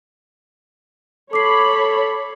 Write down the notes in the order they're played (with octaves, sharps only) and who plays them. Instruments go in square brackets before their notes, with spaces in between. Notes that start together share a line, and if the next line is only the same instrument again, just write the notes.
[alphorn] A4 [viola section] C#5 B5 [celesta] D6 C7